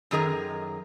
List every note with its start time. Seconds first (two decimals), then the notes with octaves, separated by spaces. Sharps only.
0.11 F#2 D#3 G#4 A#4 A#5